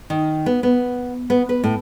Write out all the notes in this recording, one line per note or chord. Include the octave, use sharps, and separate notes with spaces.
D#3
B3
B3
B3
B4
A2